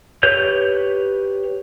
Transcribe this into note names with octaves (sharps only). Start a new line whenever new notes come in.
G4 B4 C#5 G6